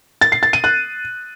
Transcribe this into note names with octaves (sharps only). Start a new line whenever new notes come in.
A6
C7
A6
D#7
F#6